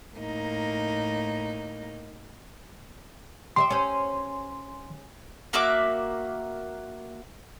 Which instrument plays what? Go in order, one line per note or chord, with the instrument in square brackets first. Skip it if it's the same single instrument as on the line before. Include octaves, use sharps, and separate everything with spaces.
[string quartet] A2 A#3 D#4
[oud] G4 D#5 E5 [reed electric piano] C6
[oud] C#4 C5
[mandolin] A#3 F#4 E5 D6